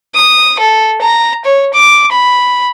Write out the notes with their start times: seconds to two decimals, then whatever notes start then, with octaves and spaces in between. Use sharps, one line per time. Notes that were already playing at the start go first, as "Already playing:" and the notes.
0.15 D#6
0.59 A4
1.01 A#5
1.45 C#5
1.74 D6
2.12 B5